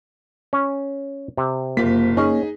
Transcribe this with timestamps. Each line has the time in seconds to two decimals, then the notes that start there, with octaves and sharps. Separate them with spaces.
0.53 C#4
1.37 C3
1.77 F#1 A#3 F4 B6
2.17 C#4 D#4 G#4